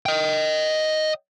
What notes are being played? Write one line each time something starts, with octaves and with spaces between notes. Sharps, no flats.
D#5 G5